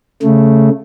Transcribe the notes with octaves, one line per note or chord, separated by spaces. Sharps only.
C#3 A3